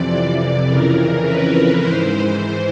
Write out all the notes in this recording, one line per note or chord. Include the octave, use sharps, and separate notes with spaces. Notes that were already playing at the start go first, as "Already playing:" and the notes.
Already playing: F2 C3 E3 D5
F2 C#3 E3 A#4
A#4
B4
G#2 E3 C5
C5